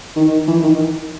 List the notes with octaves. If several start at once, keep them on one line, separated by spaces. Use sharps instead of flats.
D#3
E3
D#3